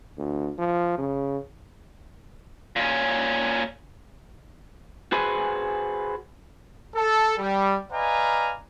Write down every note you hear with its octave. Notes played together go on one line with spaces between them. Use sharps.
D2
F3
C#3
A#2 C#4
F#4 G#4 B4 C5 G#5
A4
G3
B4 D5 D#5 F5 G#5 A#5